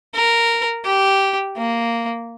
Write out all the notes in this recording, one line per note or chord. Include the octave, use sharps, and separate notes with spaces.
A#4
G4
A#3